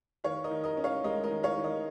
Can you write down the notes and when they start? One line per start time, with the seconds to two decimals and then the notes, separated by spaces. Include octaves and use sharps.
0.24 D#3 C#5 F5
0.44 A#4 D#5
0.51 D#3
0.64 A#4 D#5
0.77 C#4
0.84 C#5 F5
1.04 G#3 A#4 D#5
1.23 A#4 D#5
1.31 D#3
1.43 C#5 F5
1.58 D#3
1.64 A#4 D#5